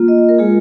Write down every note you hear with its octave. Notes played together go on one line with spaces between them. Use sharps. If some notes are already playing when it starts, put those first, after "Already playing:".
Already playing: A#3 F4
D#5
D#5
A#4
G#3 F4 G#4